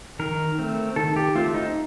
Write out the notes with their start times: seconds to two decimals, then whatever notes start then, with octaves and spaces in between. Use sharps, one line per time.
0.19 D#3 A#4
0.59 A3 C4
0.96 D#3 A4
1.16 G4
1.35 A3 C4 F4
1.54 D#4